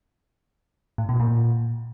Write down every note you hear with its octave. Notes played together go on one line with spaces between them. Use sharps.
A2
B2
A#2